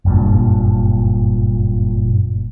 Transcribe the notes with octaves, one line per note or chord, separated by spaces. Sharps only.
F#1 G2 A#2